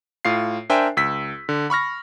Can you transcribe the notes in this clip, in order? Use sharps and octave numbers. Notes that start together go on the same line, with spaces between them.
A2 F4 C7
D4 A#4 C5 E5 G5 G#5
C#2 E6 B6
D3
B5 C#6 F6 A#6